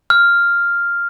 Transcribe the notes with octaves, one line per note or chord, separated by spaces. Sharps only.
F6